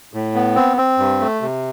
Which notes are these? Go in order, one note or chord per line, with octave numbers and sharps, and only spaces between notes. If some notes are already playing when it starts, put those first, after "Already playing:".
A2
B3
C4
C4
G2
A3
C3